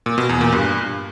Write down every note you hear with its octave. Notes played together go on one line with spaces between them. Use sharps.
A#2
B2
E2
A#2
G2